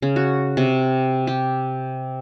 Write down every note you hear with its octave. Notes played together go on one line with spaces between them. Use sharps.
C#3
F#4
C3
G4